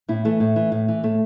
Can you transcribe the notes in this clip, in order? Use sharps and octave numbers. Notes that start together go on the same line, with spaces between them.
A2 E4
E3 A3
A2
E3
A2
E3
A2 A3